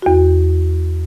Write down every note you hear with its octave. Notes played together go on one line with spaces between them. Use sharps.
E2 F#4